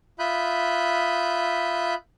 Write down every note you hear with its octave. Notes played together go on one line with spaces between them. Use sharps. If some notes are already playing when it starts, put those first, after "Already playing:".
F4 E5 B5 D#6 F#6 G6